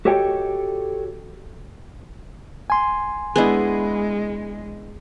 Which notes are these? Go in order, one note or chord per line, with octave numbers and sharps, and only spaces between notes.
F#4 G4 A4 C#5 D#5 G5
G#5 C6
G#3 B3 D4 E4 G#4 D#5